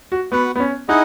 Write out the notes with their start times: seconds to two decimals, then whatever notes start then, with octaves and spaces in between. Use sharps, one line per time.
0.12 F#4
0.32 B3 F#4 B4 F#5
0.56 B3
0.60 C#4
0.89 D#4 E4 G#4 D#5 F#5